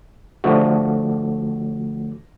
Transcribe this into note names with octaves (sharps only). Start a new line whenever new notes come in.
D3 F3 A3 F#4